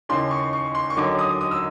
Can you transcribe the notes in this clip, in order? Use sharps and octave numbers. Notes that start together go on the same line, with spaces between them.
D#2 C#3 E3 C6
C#6
C#6
C6
C#6
D#2 D3 F#3 D6
D#6
D#6
E6